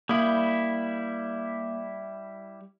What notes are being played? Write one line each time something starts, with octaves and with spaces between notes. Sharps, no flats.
G3 A#3 E4